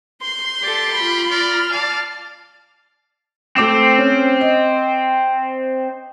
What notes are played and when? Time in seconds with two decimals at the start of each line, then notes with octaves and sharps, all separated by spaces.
0.22 C6 G6 C7
0.63 G4 A4 D5
0.94 F4 B5
1.31 D5 F6
1.72 D5 F5 A5
3.56 A3 C4 D6 E7
3.98 C#4
4.41 D#5